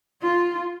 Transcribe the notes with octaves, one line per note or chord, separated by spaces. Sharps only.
F4